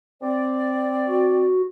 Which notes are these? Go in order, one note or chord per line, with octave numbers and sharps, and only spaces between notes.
C4 D5
F#4